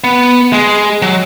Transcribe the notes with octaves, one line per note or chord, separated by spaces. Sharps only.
B3
G#3
F#3